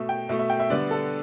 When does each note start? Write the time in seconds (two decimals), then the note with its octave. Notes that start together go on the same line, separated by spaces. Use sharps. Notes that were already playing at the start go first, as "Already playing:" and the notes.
Already playing: B2 A3 E5
0.09 G5
0.29 B2 A3 E5
0.39 E5
0.50 G5
0.60 E5
0.70 D3 G3 B3 D5
0.91 A4